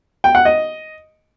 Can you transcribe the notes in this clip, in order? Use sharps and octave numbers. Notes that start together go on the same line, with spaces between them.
G5
F#5
D#5